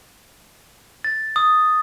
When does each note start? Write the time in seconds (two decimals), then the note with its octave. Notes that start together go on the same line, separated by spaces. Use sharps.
1.04 A6
1.36 D#6